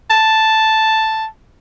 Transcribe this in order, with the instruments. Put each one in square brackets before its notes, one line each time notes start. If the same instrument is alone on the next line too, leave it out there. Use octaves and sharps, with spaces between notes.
[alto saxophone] A5